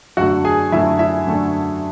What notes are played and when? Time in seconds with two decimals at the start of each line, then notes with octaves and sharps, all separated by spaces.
0.17 F#2 D3 A3 F#4 F#5
0.45 G#4 G#5
0.72 F#2 D3 A3 E4 E5
0.99 E4 E5
1.27 F#2 D3 A3